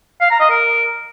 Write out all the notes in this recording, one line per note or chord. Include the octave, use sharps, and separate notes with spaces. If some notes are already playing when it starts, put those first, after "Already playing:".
F5
A#5
D#5
A#4